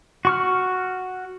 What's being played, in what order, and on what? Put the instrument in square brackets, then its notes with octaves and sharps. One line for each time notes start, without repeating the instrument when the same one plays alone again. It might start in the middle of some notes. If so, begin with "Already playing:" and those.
[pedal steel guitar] F#4 C#6 F6